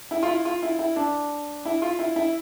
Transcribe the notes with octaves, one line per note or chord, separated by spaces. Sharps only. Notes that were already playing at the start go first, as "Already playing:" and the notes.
E4
F4
E4
F4
E4
E4
D4
E4
F4
E4
E4